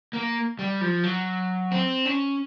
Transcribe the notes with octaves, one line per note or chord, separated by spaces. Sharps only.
A#3
G3
F3
F#3
C4
C#4